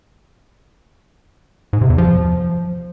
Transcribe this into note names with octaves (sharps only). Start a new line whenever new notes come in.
G#2
C3
E2
F3